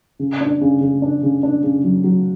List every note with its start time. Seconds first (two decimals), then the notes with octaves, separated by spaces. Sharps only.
0.19 C#3
0.41 D4
0.61 C#3
0.81 C#3
1.02 D4
1.23 C#3
1.43 D4
1.63 C#3
1.84 F#3
2.04 F#3